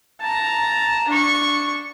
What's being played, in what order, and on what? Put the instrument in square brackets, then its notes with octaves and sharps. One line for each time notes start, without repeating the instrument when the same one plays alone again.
[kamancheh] A5 A#5
D4 C#6